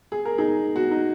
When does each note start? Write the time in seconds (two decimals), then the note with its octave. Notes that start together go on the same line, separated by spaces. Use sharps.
0.12 G#4
0.25 A#4
0.38 D#4 G#4
0.76 F#4
0.91 D#4